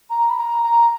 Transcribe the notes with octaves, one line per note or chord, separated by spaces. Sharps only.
A#5
B5
A#5
A#5